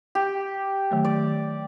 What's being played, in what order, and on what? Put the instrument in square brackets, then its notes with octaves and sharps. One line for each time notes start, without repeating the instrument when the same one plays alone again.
[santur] G4
[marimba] D#3 F#3 A3
[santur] D5